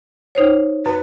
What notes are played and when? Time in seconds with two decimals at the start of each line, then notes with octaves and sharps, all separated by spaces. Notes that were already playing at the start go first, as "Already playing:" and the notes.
0.35 D#4 C5 C#5
0.86 F#2 B4